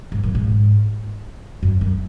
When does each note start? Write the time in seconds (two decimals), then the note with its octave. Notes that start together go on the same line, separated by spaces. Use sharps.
0.12 G#2
0.23 F#2
0.35 G#2
1.63 F#2
1.81 F#2